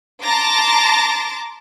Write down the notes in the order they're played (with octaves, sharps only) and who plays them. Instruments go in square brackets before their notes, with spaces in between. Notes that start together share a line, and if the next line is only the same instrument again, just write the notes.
[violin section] A5 A#5 C6 D6 A6 A#6